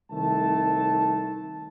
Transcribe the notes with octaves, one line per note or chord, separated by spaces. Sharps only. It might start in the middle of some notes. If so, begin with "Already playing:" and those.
C2 D#3 A3 A5